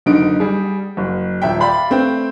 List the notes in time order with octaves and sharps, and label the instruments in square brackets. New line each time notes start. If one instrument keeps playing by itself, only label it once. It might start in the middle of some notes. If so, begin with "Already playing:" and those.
[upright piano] F#1 D3 D#4 D7
G3 G#4
F#1
D#1 E5 G5
D5 F5 G5 B5
A3 C4 B4 G5